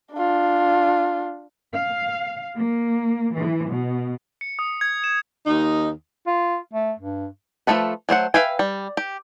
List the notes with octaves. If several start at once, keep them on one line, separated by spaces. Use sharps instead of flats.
D4 F4
F5
A#3
E3
B2
C#7
D#6
G#6
E7
D#2 D#4
F4
A3
G2
F3 G#3 A3 A4 B4
F#3 A3 C5 F#5
B4 E5 F5 G5 G#5
G3
G4